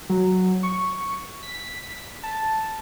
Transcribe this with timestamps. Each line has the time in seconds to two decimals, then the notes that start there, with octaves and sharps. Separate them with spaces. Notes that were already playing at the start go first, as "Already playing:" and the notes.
0.10 F#3
0.63 C#6
1.43 B6
2.23 A5